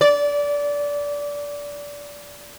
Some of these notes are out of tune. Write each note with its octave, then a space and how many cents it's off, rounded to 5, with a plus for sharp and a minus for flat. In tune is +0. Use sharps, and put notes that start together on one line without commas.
D5 -20